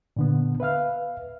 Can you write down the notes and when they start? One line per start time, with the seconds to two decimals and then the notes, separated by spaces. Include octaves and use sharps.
0.17 A#2 D3 B3
0.60 B4 E5 F5 F6